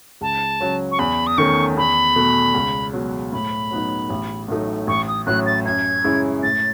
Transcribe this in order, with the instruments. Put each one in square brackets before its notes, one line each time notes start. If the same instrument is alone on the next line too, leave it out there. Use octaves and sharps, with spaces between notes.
[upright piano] C#2 [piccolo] A5
[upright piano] C#3 F#3 C#4
[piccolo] C#6
[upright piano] E2 [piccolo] B5
[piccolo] D#6
[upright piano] D#3 A3 C#4 [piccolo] C#6
[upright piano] E2 [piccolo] B5
[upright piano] B2 A3
C#2
B2 F#3
[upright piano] A2 [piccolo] B5
[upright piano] F#3 B3 D#4
A1
A2 F#3 A3 D#4
[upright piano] A1 [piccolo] C#6
[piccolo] D#6
[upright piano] A2 F#3 C#4 [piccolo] F#6
[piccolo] A6
[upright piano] F#2 [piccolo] G#6
[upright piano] C#3 G#3 C#4 E4
[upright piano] A2 [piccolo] A6